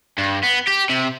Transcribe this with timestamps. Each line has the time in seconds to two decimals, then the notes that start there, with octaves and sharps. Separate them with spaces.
0.18 G2
0.43 B3
0.67 G4
0.89 C3